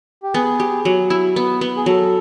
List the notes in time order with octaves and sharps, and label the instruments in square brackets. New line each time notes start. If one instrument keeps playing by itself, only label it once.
[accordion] G4
[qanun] B3 [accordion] G#4
[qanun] G4
F#3
E4
B3
B3
[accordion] G#4
[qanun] F#3 [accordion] A4